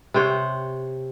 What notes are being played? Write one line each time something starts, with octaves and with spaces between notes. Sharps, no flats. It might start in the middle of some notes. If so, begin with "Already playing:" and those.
C3 C5 C#5 F#5